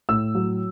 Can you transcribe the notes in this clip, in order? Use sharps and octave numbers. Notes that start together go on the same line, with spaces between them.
A2 E6
F#3